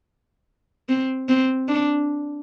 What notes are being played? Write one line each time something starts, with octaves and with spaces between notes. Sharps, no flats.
C4
C4
D4